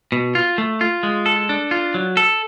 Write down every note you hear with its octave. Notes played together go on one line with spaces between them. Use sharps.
B2
F4
A3
F4
G#3
A4
D4
F4
F#3
A4